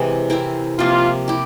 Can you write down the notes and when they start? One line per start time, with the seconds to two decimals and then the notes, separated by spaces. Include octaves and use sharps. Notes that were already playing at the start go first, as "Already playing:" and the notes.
Already playing: C3 E3 G#3 C4
0.30 C4 E4 A#4
0.78 C3 F3 A#3 F4
1.28 E4 G4